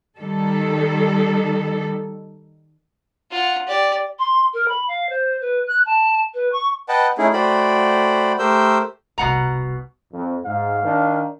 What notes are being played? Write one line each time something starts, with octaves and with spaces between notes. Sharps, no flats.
D#3 G3 A4
F4 F#5
G4 D5
C6
A#4
B5
F5
C5
B4
F#6
A5
B4
C#6
B4 D#5 F#5 G5 A5
A3 C#4 D#4 E4 G#4
A3 F#4 C5 D5 G5 B5
A3 G4 A#4 C5 E6 G6
D#1 C2 B2 F#5 A#5
F2
G#2 F5
D#3 D4